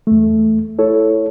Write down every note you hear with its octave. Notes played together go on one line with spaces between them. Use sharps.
E2 A3
E4 A4 C#5